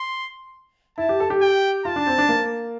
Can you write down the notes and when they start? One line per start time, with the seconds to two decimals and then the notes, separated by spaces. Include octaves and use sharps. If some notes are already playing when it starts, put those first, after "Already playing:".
Already playing: C6
0.98 E4 A5
1.09 G4
1.20 A4
1.30 G4
1.42 G5
1.85 F4 A5
1.96 D4
2.07 C4
2.18 D4
2.29 A#3